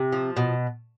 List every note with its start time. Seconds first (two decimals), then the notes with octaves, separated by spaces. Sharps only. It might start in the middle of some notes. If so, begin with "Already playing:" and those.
Already playing: C3
0.13 F3
0.37 B2